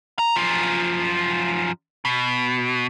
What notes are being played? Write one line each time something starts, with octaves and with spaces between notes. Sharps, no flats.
A#5
F#2 F3
B2